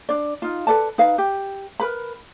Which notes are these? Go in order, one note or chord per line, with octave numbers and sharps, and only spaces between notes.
D4 D5
D#4 F4
A4 B4 D5 A5
D#4 B4 F5
G4
A#4 B4 B5